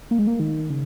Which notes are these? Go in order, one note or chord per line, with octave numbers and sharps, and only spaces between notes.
A#3
G#3
A#3
D#3
C#3